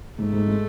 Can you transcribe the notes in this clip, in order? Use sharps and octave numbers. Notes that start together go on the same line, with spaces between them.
G#2 A3
G#2
G#3